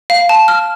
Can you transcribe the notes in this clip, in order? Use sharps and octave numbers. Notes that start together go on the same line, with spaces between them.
F5
A5
F6